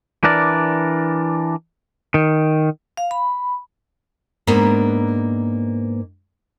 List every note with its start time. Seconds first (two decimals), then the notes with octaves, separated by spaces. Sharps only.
0.24 E3 D4 A#4 D5
2.14 D#3
2.97 F5
3.11 B5
4.47 G#2 A#3 B3 D4